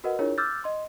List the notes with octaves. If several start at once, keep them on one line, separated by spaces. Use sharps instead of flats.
F#4 A#4 B4 D#5 F#5
D4 E4 F4 G#4 A#4 C#5
D6 E6 F6 G6 A6
D#5 C6